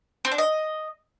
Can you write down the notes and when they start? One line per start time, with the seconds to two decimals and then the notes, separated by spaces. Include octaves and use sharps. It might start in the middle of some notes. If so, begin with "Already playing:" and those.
0.25 C4
0.32 D4
0.38 D#5